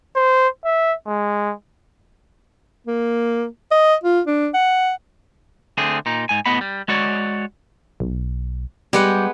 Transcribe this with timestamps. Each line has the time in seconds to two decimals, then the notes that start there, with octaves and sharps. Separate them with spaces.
0.16 C5
0.65 E5
1.07 G#3
2.86 A#3
3.71 D#5
4.04 F4
4.27 D4
4.54 F#5
5.78 D3 A3 C4 G#4
6.06 A#2 D#4
6.29 G#2 G#5
6.46 A2 B3 D#5 F#5 B5
6.61 G3
6.88 G#3 F#4 C#5 D5
8.00 B1
8.93 G3 G#3 B3 G4 F#5